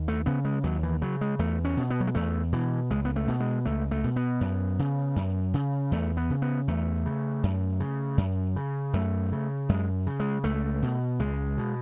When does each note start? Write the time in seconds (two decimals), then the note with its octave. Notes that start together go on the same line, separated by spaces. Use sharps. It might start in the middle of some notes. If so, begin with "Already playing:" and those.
Already playing: D#2
0.08 A3
0.26 C#3 B3
0.45 G#3
0.64 D#2 F#3
0.83 E3
1.02 C#3 F#3
1.21 G#3
1.39 E2 A3
1.65 C#4
1.77 B2
1.90 B3
2.00 F#3
2.07 G#3
2.15 E2 A3
2.53 B2 E3
2.91 C#2 G#3
3.05 B3
3.16 A3
3.28 B2
3.40 G#3
3.66 C#2 A3
3.91 A3
4.04 B2
4.16 B3
4.41 F#2
4.79 C#3
5.16 F#2
5.54 C#3
5.91 E2 A3
6.17 B3
6.30 C#3
6.42 B3
6.68 E2 A3
7.06 C#3
7.43 F#2
7.80 C#3
8.18 F#2
8.56 C#3
8.93 F#2 A3
9.32 C#3
9.69 F#2 G#3
10.07 C#3
10.20 G#3
10.44 C#2 A3
10.82 B2
11.19 C#2 G#3
11.58 B2